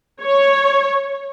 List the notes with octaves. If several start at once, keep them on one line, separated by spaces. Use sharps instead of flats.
C#5